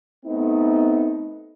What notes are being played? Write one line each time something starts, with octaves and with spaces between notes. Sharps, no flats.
A3 B3 C4 D#4